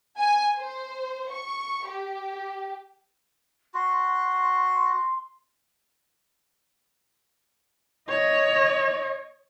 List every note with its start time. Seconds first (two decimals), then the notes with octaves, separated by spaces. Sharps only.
0.19 G#5
0.57 C5
1.31 C#6
1.87 G4
3.74 F#4 C6
8.09 C#5 D#5